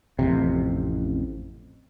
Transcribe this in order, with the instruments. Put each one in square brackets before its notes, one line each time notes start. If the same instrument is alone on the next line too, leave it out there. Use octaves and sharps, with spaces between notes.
[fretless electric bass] A1 F2 C3